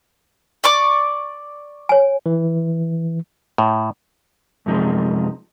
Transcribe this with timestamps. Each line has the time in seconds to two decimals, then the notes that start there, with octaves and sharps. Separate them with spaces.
0.64 D5 C#6 D6
1.89 C#5 G#5
2.26 E3
3.58 A2
4.66 F#2 C3 F3 G#3 D#4